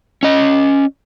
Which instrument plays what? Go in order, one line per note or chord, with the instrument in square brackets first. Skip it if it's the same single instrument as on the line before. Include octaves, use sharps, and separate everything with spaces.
[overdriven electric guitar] C#4 D#5